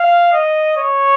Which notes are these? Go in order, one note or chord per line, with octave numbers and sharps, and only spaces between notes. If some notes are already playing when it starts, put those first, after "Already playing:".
Already playing: F5
D#5
C#5